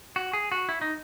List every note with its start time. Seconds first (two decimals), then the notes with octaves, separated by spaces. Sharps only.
0.16 F#4
0.33 G#4
0.52 F#4
0.69 E4
0.81 D#4